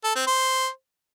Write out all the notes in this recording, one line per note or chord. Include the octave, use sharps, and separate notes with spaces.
A4
C4
C5